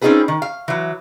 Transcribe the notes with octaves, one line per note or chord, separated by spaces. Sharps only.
C4 C#4 D#4 F4 G#4 B4
D#3
F5
E3 F#3